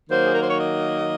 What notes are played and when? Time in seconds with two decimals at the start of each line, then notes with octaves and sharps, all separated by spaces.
0.10 D#3 F#3 A#3 C5
0.25 G#4
0.33 A#4
0.41 C5
0.48 C#5
0.57 D#5